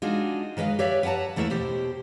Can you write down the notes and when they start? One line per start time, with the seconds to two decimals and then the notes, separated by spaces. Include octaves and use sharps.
0.02 G#3 D4 D#4 F4 F#4 G#4
0.57 D#3 G#3 B4 D#5 F5
0.79 G4 B4 C#5 D5 E5 F5
1.03 B4 F#5 G5 A5 A#5
1.36 E2 A3 A#3 E4 B4 E5
1.50 B2 G4 C5